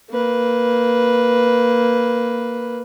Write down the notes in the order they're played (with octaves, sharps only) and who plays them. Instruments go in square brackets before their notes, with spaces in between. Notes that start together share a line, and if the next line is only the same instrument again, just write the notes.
[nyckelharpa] A#3 B4